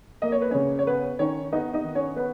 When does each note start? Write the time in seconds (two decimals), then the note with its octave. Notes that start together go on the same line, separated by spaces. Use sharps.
0.22 A#3 D#5
0.32 C#5
0.42 B4
0.51 C#3 C#4 C#5
0.79 C#5
0.87 B3 B4
1.19 D#3 C#4 C#5
1.52 B3 D#4 D#5
1.73 D#4 D#5
1.84 D#3
1.95 C#4 C#5
2.16 B3 B4